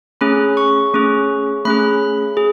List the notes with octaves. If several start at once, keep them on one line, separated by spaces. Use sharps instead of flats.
A3 C#4 G#4 B5
C#6
A3 C#4 G#4
A3 C#4 G#4 B5
G#4